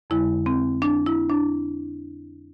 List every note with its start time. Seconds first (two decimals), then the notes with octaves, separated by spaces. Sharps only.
0.10 F2 D3 G#3 E4
0.46 C4
0.82 D4
1.06 E4
1.30 D4